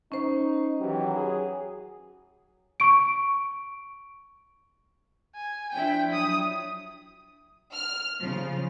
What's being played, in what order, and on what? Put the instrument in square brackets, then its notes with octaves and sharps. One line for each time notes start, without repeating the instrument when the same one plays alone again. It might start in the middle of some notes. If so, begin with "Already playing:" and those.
[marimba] C#4 C5 [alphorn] D#4
[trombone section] D#3 E3 G4 [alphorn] F#3
[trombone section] G#4
[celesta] C#6 D7
[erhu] G#5
[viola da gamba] F3 D4 E4 [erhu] G5
[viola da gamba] F#3 [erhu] D#6
[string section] F6
C#3 F3